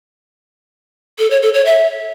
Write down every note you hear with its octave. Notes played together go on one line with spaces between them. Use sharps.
A4
C#5
A4
C#5
E5